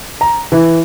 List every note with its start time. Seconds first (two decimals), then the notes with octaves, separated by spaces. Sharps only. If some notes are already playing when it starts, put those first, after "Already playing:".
0.21 A#5
0.52 E3